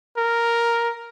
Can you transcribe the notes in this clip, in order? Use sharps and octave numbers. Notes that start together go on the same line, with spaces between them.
A#4